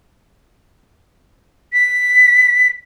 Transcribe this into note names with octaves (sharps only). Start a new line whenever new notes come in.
B6